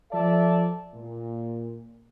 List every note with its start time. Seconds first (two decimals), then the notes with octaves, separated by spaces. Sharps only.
0.11 F3 A4 D5 E5 A5
0.94 A#2